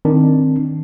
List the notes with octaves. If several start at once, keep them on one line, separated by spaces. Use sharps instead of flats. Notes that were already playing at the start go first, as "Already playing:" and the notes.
D#3 C4 D4